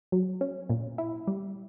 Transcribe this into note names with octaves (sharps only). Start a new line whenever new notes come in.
F#3
C#4
A#2
E4
G3